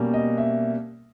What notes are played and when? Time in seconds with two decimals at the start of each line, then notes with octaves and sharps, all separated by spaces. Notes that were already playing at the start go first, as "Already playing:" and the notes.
Already playing: B2 G3 A#3 C#4
0.13 D#5
0.37 E5